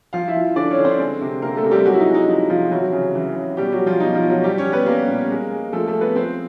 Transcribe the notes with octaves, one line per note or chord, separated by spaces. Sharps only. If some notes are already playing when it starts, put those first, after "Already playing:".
F3 F4 F5
E4 E5
F3
D3 D4 D5
C#4 C#5
D3
C4 C5
G#3
C3
C3 A#3 A#4
A3 A4
C3
G3 G4
F#3 G#3 F#4
E4
D#4
G#3
D#4
F3 D#4
C3 F3 F4
E3 F#3 F#4
C#3
E3
C#3
B2 G3 G4
F#3 F#4
G3
F3 F4
B2 D#4
F3 F4
B2
F#3 F#4
G3 G4
C#4 C#5
G3
B3 B4
G3 A#3 A#4
A#2
G#3
G#3
F3 A3 A4
A3 A4
G#3
B3 B4
F3 C4 C5